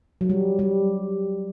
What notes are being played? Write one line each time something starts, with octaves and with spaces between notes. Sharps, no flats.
F#3
G3
G3